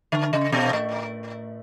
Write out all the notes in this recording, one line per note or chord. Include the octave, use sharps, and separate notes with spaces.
D3
C#3
B2
A2